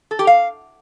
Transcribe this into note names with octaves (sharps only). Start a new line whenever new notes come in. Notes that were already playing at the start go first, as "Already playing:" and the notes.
A4
G4
F5